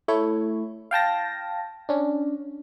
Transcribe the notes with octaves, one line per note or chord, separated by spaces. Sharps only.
A3 E4 C#5
F5 G5 A5 A#6
C#4 D4